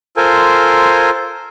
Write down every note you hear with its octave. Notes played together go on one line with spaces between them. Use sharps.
F4 A4 A#4 C5 G#5